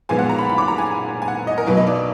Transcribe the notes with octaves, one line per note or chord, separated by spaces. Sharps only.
B1 A#2 F3 G#3 B3 G#5
F#5
A#5
B5
B5
D6
A#5
G#5
G#5
F#5
D#5
A#4
B1 B2 F#3 B4
D#5
D5